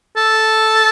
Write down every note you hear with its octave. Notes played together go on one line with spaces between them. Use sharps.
A4